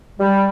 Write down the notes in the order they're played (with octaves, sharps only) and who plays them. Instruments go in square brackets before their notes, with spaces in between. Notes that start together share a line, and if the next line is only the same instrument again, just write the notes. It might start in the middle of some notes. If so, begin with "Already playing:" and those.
[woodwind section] G3